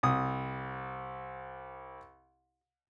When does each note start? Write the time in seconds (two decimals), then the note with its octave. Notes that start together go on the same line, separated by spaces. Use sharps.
0.03 C2 D#6